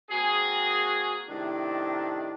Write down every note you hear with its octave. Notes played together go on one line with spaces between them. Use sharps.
A#3 C4 F#4 G#4
A2 C3 D#3 D4